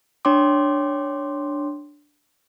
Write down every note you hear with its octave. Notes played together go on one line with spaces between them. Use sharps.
D4 C#5 G5 C6 D6